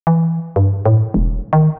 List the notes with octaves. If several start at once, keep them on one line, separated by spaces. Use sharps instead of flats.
E3
G2
A2
E1
D#3